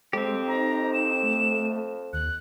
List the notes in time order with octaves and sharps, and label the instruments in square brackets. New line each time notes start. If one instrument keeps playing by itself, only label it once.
[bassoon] F2 [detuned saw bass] G#3 [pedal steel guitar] C4 G4
[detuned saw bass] D#4 [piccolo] A#5
[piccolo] E7
[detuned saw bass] A3
[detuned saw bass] D#2 [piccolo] F#6